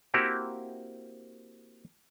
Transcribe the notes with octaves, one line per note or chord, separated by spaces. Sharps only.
A#3 C4 E4 F#4 G4